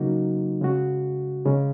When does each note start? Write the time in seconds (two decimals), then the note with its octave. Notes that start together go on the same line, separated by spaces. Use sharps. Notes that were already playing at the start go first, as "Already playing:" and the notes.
Already playing: C#3 F#3 A#3 D#4 F#4
0.61 C#3 G#3 F#4
1.46 C#3 G#3 C#4